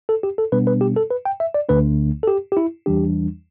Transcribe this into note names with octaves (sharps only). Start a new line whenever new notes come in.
A4
G4
A4
B2 G3 B3 D4 B4
B4
G4
A4
B4
G5
E5
D5
D2 D3 A3 D4 B4
A4
G4
G4
E4
E2 E3 G3 D4 G4